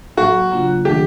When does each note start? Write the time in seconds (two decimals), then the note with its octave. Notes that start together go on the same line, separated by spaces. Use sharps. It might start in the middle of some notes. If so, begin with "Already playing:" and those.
0.17 A2 F#3 A#3 F#4
0.51 C#3 F#3 A#3 D4 F4
0.85 D#3 F#3 A3 D4 G4